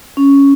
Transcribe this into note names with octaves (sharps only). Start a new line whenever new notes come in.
C#4